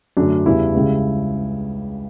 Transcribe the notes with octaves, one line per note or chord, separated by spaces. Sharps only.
F#2 D3 A3 D4
E2 C#3 G3 E4
C#2 C#3 G3